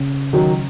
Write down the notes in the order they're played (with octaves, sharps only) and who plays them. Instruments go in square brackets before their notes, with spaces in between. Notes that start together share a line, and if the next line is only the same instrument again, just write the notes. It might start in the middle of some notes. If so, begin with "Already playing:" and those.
Already playing: [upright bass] C#3
[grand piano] D#3 F#3